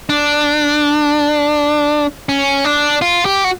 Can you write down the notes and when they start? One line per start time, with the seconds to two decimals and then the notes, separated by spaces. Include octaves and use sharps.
0.09 D4
2.29 C#4
2.65 D4
3.02 F4
3.25 G4
3.44 F#4